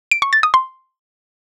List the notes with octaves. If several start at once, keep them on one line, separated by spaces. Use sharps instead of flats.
D7
C#6
A6
D#6
C6